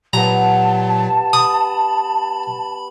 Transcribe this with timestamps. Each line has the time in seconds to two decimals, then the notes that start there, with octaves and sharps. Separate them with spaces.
0.13 A#2 F#3 B3 G4 A5 A#5
1.33 B5 D#6